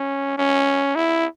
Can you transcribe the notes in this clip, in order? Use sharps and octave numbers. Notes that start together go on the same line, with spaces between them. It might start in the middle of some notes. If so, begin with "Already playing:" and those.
Already playing: C#4
C#4
E4